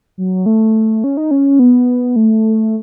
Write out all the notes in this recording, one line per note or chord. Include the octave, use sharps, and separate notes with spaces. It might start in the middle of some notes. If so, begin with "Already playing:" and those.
F#3
A3
C#4
D#4
C#4
B3
A3